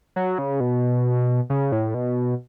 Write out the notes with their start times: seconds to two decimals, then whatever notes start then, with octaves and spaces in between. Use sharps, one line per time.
0.16 F#3
0.38 C#3
0.60 B2
1.50 C#3
1.72 A2
1.94 B2